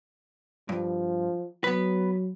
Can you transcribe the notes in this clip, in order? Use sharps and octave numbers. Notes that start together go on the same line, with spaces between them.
G2 F3
F#3 B3 B4